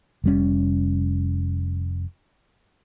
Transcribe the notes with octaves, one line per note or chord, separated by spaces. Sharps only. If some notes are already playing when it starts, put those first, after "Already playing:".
F1 G3 C#4